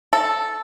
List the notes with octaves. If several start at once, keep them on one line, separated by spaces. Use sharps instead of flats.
A4